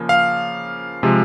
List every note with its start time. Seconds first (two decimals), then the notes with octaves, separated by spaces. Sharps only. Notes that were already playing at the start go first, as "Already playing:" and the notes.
Already playing: C#3 F3 A#3
0.09 F5
1.03 C3 F3 G#3